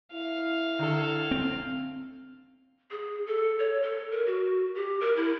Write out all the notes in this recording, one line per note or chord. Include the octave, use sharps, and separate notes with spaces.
E4 F5
D3 A4
C4
G#4
A4
C#5
A4
A#4
F#4
G4
A#4
E4